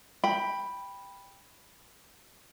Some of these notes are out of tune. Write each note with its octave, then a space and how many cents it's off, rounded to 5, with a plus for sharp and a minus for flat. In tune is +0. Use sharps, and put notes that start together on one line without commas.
G5 +15 B5 +0